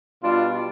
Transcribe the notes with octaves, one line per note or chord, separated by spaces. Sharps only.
B2 G3 D4 F4